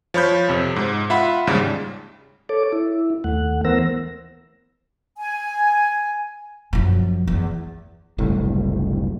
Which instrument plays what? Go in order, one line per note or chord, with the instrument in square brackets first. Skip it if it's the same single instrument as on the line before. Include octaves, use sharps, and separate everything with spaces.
[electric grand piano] F3 C#5 B5 G6
F2 C3
G#2
F4 E5 F#5 B5
D#2 G#2 C#3 G3
[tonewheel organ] A4 C#5 D6
E4
D#2 A3 F#5
E3 B3 A#4 C5 E6 A#6
[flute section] G#5
[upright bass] F#2 F3
E2
[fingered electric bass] F#1 C2 A2